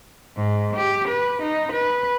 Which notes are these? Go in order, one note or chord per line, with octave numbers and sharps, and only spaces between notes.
G#2
G4
B4
D#4
B4